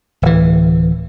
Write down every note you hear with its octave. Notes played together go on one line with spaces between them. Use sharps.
D1 E3